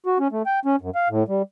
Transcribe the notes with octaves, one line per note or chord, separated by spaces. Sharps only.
F#4
C#4
A3
G5
C#4
F#2
F5
A2
G3